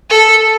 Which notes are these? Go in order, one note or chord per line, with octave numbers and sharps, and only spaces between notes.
A4